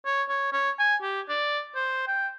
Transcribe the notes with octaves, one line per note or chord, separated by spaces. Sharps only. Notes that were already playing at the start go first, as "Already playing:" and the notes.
C#5
C#5
C#5
G#5
G4
D5
C5
G5